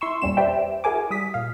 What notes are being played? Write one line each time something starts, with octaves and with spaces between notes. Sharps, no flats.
E4 C6 C#6 E6
E2 A#2 G3 C#4 E7
G4 B4 C5 D5 E5 G5
E4 F#4 G#4 A#4 G#5 D6
G3 D#6 B6
A#2 F5